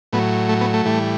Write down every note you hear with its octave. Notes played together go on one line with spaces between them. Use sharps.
A2 F#3 B3
A3
B3
A3
A2 E3 G3